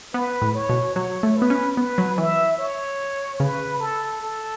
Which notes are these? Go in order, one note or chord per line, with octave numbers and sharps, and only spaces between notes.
B3 B4
A2
C#5
B2
F#3 C#5
A3
B4
B3
C#4
B3 B4
F#3
E3 E5
C#5
C#3 B4
A4
A4